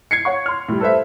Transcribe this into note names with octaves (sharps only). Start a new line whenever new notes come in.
G#6 C7 C#7
C#5 F#5 C#6
C6 F6
A2 G3
A4 B4 C5 E5